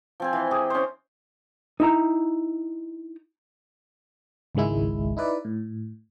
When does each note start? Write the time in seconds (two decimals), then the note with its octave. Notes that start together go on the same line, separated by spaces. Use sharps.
0.20 F3 C4 G#5
0.33 E3
0.51 G4 G#4
0.70 C#4 C5
1.80 D#4 E4 A#5
4.55 G#1 C#2 D#3 G#3 E4
5.17 D#4 E4 B4 D5
5.45 A2